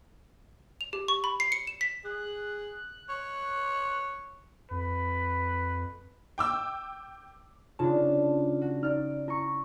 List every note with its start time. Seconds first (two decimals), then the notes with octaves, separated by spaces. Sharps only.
0.81 F7
0.93 G4
1.08 C#6
1.24 B5
1.40 C7
1.52 C#7
1.67 E7
1.81 B6
2.05 G#4 F#6
3.09 C#5
4.71 F2 B4
6.38 G5 D6 E6
7.79 C#3 D4 D#4 F4 A5
8.61 F#4
8.83 D#4 D5 F6
9.28 E4 A#5 C#6